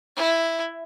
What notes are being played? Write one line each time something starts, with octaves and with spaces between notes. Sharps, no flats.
E4